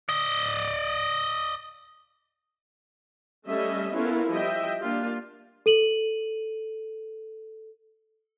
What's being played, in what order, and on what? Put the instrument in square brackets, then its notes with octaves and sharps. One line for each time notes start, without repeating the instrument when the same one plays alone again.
[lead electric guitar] D5 D#5
[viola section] G3 A3 C#4 A4 D#5 E5
B3 C#4 E4 F4 A4 A#4
F3 G3 D#5 E5 G5
A#3 D4 F4 G4
[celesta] A4 D#7 F#7